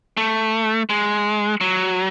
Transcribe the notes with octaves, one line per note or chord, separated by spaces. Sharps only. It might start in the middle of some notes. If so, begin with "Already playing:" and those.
A3
G#3
F#3